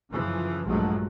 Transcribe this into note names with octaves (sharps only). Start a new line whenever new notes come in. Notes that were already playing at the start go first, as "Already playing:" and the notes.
F#2 C#3 E3 F3
A#1 G2 F3 F#3 G#3 A3